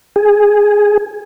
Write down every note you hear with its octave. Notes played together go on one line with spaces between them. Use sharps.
G#4